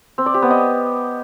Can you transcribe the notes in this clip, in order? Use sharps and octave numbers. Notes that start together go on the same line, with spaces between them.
C4
D5
G4
B3
D#5